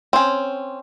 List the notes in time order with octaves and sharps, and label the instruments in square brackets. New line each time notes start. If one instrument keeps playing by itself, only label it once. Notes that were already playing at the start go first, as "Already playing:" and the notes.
[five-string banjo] C4 C#4